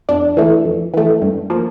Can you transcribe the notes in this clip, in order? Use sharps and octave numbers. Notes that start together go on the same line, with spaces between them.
F2 D4
E3 A3
F2
E3 A3
G2
F3 A#3